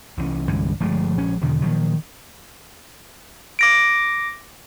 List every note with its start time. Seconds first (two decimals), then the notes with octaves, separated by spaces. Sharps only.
0.18 C2 E3 C#4
0.48 G2 D3 G#3
0.80 G1 F3 G#3 A3
1.17 A#1 C#4
1.42 E2 B2 D3 D#3
1.62 A#2 D#3 F3 F#3
3.59 D6 A#6 D7